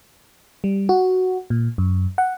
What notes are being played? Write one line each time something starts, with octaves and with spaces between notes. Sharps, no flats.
G3
F#4
A#2
F#2
F#5